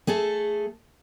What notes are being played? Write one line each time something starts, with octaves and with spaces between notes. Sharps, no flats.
A3 G#4 A4